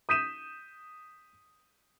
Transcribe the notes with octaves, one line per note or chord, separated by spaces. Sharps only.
D#6 G6 B6 D#7 E7